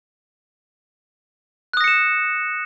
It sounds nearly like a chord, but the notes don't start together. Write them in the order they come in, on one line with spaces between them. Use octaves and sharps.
F#6 D#6 A#6 C#7 E7